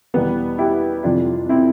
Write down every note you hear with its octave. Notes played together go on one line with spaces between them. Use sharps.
E2 B2 G3 B3
E4 G4
F2 C3 E3 G3 D4 F4
C4 E4